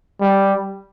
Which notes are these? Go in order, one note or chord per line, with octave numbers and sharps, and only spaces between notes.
G3